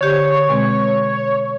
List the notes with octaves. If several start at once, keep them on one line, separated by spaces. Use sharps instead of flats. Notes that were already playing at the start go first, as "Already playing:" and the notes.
D3 G4 C5 C#5
B2 G#3 C4